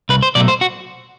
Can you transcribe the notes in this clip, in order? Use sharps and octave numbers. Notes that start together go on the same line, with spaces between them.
C2 B4
C5
B2 F#3 A3 D5
C5
F#4